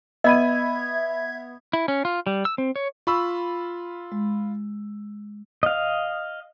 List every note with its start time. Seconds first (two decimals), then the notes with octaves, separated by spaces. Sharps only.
0.24 B3 D#5 E5 B5 G#6 D#7
1.73 E4
1.88 C#4
2.05 F4
2.27 G3
2.45 E6
2.58 C4
2.76 C#5
3.07 F4 B5 C#6 E6
4.12 G#3
5.63 D#5 F5